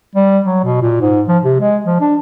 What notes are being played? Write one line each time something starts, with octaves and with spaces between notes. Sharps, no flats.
G3
F#3
B2
A#2
G#2
F3
C3
G#3
F3
D4